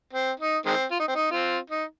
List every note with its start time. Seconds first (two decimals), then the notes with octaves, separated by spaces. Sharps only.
0.13 C4
0.39 D#4
0.66 D#3 G#3 C4
0.91 F4
0.99 D#4
1.08 C4
1.15 D#4
1.31 C4 F4
1.70 D#4